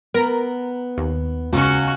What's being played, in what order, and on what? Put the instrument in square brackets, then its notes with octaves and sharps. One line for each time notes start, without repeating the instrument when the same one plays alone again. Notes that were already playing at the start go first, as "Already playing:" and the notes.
[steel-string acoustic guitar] B3 [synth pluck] A#4
[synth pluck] D#2
[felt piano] C#2 [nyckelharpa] C#4 F#4